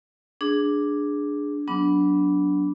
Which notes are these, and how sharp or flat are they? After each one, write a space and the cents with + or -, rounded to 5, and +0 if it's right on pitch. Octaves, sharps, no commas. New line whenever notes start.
D4 +0 G#4 +0
F#3 +0 B3 +0 D4 -15